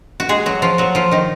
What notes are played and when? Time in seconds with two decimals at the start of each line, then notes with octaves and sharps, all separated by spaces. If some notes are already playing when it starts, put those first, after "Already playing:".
0.20 F#4
0.29 G#3 G#4
0.46 F#3 F#4
0.62 F3 F4
0.78 F#3 F#4
0.95 F3 F4
1.11 D#3 D#4